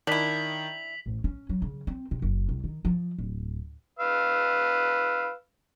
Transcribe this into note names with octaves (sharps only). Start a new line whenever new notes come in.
D#3 D4 E4 B6 F7 F#7
A1
C#4
F#3
C#3
C4
C3
F#1
C2
D#3
F3
D1
B4 F5 E6